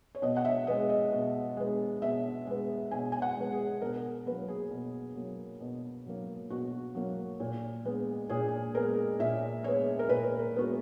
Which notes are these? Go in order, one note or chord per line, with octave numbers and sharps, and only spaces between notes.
C#5
B2 D#5
F#5
E5
G#3 B3 D#5
D#5
B2
G#3 B3
B2 E5
G#3 B3
B2 G#5
G#5
F#5
G#3 B3
G#4
B2 A#4
F#3 A#3 B4
G#4
B2
F#3 A#3
B2
F#3 A#3
B2 F#4
F#3 A#3
A#2
G#3 B3
A#2 G#4
G#3 B3 A#4
A#2 E5
G#3 B3 C#5
A#4
A#2 B4
A#4
G#3 B3 F#4